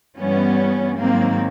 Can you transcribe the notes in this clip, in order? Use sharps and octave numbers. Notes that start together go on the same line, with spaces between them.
G2 E3 G3 B3 C#4
G#2 D#3 F#3 A#3 C4